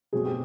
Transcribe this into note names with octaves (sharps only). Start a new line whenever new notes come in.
B2 F#3 A3 C4 G#4
G4